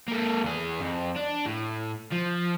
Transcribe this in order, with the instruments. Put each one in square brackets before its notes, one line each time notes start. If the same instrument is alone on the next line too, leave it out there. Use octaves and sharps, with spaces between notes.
[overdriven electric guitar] A#3 A4
E2 G#4
F2
D4
A2
F3